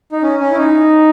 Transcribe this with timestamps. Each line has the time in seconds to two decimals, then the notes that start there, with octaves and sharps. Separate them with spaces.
0.12 D#4
0.22 C#4
0.40 C#4
0.52 E4
0.57 D#4